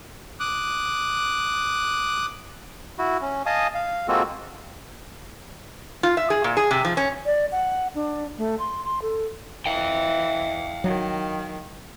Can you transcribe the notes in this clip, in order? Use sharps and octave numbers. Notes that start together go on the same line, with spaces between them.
D6 D#6 F#6
E4 F#4
C#4
D#5 F5 G#5 A5 D#6
F5
G#3 A#3 C4 F4 F#4 A4
F4
E5
G#4
A#2
G#4
C3
F3
C#4
D5
F#5
D4
A3
C6
C6
A4
E3 F5 G5
D#3 F#3